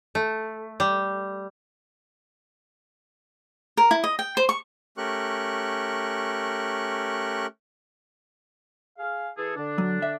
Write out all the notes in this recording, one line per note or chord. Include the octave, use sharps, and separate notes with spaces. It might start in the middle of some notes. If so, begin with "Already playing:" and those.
A3
G3
A#4
E4
D#5
G5
C5
C#6
A3 C#4 G4 A#4 C#6 F#6
G#4 F5
E3 G#4 A4
D3 D4
F#3
E5